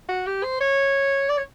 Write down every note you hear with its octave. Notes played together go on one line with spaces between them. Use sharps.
F#4
G4
C5
C#5
D5
C#5